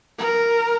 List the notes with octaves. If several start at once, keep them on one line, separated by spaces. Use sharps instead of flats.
A#4